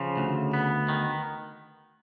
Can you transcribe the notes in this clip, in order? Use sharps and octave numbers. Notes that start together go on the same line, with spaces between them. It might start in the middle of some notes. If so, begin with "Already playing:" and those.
Already playing: C#3 F3
D2
B3
D#3